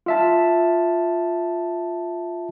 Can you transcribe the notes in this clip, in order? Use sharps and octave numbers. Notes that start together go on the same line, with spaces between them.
F4 E5 A5